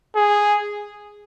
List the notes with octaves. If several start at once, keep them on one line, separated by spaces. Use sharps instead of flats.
G#4